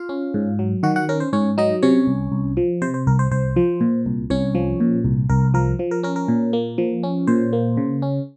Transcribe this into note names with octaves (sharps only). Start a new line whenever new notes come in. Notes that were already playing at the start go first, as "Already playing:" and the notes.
Already playing: F4 F5
C#4
G#2
F#3
D#3 F#4 F#5
F#4 F#5
C#4 A#4
C5
G#2 C#4 C#5
F#3 D#4 D#5
C3 C#4 C#5
C2
C2
F3
C3 C5
C5
C2 A#4
C5
C2 C5
F3
A#2
C2
C2 C#4 C#5
F3
A#2
C2
C2 A#4
F3 A#4
F3
A#4
C#4 A#4
A#4
A#2
A#3
F3
C#4
A#2 C5
A#3
C#3
C#4